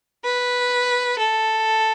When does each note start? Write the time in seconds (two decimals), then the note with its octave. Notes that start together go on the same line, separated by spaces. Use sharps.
0.25 B4
1.18 A4